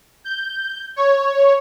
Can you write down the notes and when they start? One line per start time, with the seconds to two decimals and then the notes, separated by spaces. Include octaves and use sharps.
0.24 G6
0.96 C#5